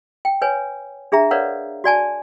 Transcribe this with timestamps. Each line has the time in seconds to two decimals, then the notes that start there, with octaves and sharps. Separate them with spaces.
0.25 G5
0.42 B4 C#5 G#5
1.12 D4 G#4 E5 A#5
1.31 A#4 B4 C#5 D5 F5 F#5
1.84 F#4 D5 G#5 A5